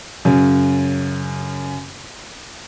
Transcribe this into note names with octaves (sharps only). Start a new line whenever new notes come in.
F#2 C#3